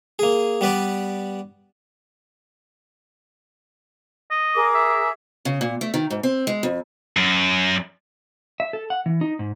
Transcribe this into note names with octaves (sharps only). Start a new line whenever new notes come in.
A#3 G#4
G3 B3 B4 D5
D#5
G#4 A#4 D6
E5
C#3
A#2
A3
D#3
G#2
C4
G#3
F2
F#2
E5
A4
F#5
E3
D#4
G#2